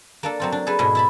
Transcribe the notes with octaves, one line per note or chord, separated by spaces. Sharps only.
A#3 D4 A4
F#3 C4 F4
D4
G#4 A4 B4
G#2 B2 E4 G#4 D#5
E4 A5 B5